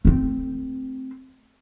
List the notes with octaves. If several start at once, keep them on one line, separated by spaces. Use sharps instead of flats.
A3 C4